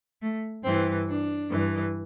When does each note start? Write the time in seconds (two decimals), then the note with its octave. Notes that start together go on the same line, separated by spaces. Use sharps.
0.21 A3
0.64 G2 E3 C4
1.07 D4
1.50 G2 E3